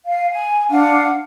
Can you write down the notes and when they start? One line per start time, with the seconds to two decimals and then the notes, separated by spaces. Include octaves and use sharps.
0.05 F5
0.30 G#5
0.70 D4 F5 F#5